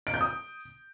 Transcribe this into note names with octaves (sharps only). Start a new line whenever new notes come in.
D7
G6
D#6